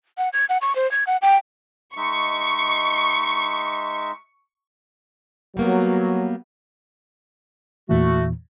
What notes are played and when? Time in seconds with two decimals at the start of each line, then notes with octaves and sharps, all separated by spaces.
0.18 F#5
0.33 G#6
0.49 F#5
0.61 C#6
0.76 C5
0.91 G#6
1.07 F#5
1.22 G5
1.97 G#3 D#4 E5 C#6
5.57 F#3 G3 A#3 B3
7.89 E2 A#2 E3 A3 F#4